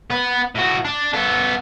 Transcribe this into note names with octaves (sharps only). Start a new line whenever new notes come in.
B3 B4
A2 F#4
D4
B3 A4